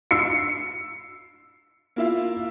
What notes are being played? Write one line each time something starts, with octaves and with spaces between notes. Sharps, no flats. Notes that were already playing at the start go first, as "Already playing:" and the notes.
E6 C7 C#7
A#3 E4 F4